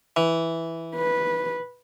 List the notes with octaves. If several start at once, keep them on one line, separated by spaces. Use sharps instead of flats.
E3
B4